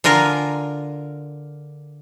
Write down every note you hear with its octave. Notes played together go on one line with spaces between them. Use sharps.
D3 F4 A#4 G#5 A#5